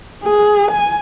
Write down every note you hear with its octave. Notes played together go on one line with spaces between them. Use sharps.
G#4
G#5